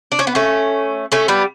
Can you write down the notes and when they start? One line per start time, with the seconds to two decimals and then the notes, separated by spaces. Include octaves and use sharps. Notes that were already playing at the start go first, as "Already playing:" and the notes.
0.12 D4
0.19 C#4
0.27 B3
0.35 A3 C#4
1.12 A3 C#4
1.28 G3 B3